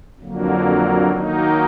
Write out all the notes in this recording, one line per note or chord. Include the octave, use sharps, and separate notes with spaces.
F2 D3 F#3 A#3
D#3 F#3 A#3 D#4